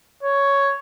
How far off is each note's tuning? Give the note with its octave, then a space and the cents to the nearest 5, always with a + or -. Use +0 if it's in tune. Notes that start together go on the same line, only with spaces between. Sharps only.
C#5 +5